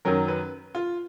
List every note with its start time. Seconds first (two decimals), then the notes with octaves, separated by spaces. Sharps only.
0.05 F#2 D#3 F#3 A#4
0.28 B4
0.75 F4